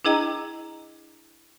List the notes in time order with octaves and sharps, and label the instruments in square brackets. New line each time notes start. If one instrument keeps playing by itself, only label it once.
[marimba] D4 E4 G#4 D#5 G5 A#5